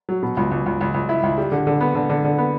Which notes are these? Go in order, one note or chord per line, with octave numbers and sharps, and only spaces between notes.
F#3
B2
C#2
C#2
C#2
C#2
C#2
E4
C#2
G3
D3
D3
B3
D3
D3
D3
B3